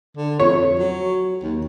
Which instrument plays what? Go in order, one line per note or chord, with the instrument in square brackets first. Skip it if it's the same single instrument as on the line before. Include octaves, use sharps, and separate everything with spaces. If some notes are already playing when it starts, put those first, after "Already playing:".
[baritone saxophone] D3
[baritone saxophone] F2 [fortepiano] C#5
[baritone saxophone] F#3
D#2